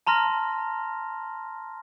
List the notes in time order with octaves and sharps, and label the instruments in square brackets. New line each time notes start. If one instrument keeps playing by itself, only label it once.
[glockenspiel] A5 A#5 C6 F6 A#6